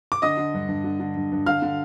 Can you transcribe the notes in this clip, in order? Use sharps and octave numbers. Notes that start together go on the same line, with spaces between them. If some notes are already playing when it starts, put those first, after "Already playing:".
D6
D3 D#5 D#6
D3
G2
G2
D3
D3
G2
G2
D3 F5 F6
D3